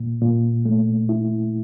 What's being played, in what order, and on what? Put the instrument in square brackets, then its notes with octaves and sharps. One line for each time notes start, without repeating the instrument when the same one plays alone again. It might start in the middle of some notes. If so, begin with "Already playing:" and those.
Already playing: [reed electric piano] A#2
A#2
A3
E4